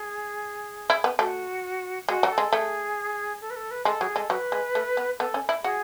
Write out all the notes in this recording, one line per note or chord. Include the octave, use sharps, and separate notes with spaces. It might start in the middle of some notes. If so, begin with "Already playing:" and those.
Already playing: G#4
E4
B3
A3 F#4
G#3 F#4
F#3
A4
G#3
A3 G#4
A4
B4
A4
B4
G#3 A4
F#3 G#4
G#3 A4
F#3 B4
G#3
A3
B3
B3 A4
C#4
E4
F#4 G#4